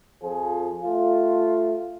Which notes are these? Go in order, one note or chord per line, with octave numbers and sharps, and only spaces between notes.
F2 F3 G#4
A3 F4